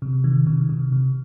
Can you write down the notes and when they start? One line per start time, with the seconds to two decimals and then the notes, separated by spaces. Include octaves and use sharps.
0.02 C3
0.24 D#3
0.47 C3
0.69 C3
0.92 C3